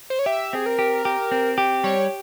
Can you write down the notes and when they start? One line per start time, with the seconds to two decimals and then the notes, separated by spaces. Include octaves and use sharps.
0.10 C5
0.19 C#5
0.26 G4 E5
0.53 C4 G#4
0.66 A#4
0.79 G4
1.05 G4
1.31 C4
1.58 G4
1.84 G3 C#5